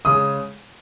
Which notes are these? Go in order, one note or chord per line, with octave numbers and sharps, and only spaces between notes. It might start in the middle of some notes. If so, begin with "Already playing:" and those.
C#3 G#3 D#6